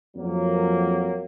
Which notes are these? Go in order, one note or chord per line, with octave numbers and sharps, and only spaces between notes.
F2 F#3 A#3